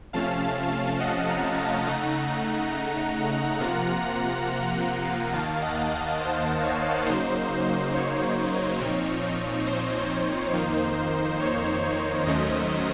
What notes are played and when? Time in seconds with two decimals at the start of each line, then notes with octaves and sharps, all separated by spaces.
0.13 C3 F3 A3 C#4 F5 A5
1.00 D#5 F#5
1.29 F#5 A#5
1.58 F5 A5
1.87 C#3 A3 D#4 F#5 A#5
3.60 C3 F3 A#3 F4
5.33 D#2 D#3 A#3 F5 A5
5.62 D#5 F#5
6.20 C5 D#5
6.63 C#5
7.06 C#3 F#3 A#3 D#4 C5
7.94 C#5
8.80 A#2 F3 C4 D#4
9.67 C5
10.54 F2 D#3 A#3 D#4
11.40 C#5
11.83 C#5
12.26 D#2 D#3 F#3 A3 C#4 C5 D#5